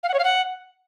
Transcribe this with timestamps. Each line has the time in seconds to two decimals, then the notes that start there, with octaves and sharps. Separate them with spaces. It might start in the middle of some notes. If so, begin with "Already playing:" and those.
0.03 F5
0.09 F#5
0.14 C#5
0.19 F5
0.24 F#5